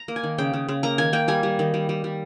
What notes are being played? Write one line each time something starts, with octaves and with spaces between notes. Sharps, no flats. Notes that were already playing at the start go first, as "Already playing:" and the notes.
Already playing: A#5
A#3
G#5
D#3
C#3 G5
C#3
C#3
A#3 A#5
D#3 G#5
A#3 G5
G3 G#5
G3
D#3
G3
G3
G3